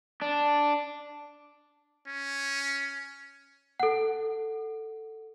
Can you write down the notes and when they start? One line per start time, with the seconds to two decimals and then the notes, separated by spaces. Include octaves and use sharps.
0.22 D4
2.07 C#4
3.80 A4 F#5